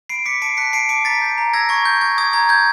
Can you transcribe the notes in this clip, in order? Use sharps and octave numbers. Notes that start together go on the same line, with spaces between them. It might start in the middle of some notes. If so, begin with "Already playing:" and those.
B5 C7 D7
D6 B6 C#7
A5 C7 D7
F#6 B6 C#7
A5 C7 D7
D6 C7 D7
A#5 A6 B6
G6
A#5
E6 G#6 A#6
C#6 G#6
G6
C#6 G#6
D#6 G#6
A#5 G#6
G6 G#6